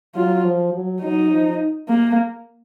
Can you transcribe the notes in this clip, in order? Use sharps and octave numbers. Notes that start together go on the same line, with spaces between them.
F#3 F4
F3
F#3
F#3 D#4
F3
A#3